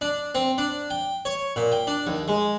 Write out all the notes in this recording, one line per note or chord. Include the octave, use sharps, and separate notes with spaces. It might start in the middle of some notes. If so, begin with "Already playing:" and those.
D4
C4
D4
G5
C#5
A#2
G5
D4
D#2
G#3